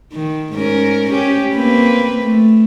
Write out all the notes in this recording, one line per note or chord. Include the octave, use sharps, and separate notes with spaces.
D#3
G#2 C#4 A#4
C#4 G4
A#3 C4 B4
A3